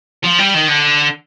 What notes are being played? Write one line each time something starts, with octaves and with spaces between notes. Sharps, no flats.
F3
G3
D#3
D3